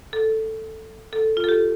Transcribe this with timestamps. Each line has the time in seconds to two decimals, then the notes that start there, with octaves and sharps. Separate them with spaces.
0.13 A4
1.13 A4
1.37 F4
1.44 A4
1.49 G4